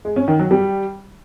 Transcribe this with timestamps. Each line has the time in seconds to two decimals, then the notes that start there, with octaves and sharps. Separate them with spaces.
0.05 G#3
0.16 C#4
0.28 D#3
0.39 F#3
0.51 G3